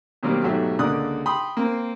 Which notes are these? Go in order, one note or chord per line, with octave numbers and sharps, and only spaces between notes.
B2 D#3 F#3 G3 A#3 C4
G#2 B2 F#3 A3 G4 E5
C#2 D3 A#3 D5 D#6 F#6
G5 B5 C6 D#6
A#3 C4